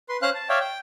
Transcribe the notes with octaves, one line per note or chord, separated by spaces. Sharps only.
B4 C6
C#4 C5 F5 C6 F#6
A5
C#5 D5 E5 F5 G5
G5